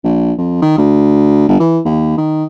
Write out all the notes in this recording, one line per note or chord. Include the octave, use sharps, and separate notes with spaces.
A#1
F2
D#3
D2
G1
E3
D#2
D#3